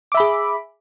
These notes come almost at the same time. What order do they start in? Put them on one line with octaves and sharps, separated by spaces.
D6 E5 B5 G#4